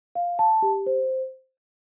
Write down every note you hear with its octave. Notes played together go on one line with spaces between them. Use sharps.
F5
A5
G4
C5